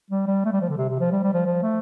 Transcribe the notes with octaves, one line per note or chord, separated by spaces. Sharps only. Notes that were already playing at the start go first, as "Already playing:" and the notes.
G3
G3
A3
G3
F3
D3
C3
C3
F3
G3
G3
F3
F3
A3